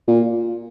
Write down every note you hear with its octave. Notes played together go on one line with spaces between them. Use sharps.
A#2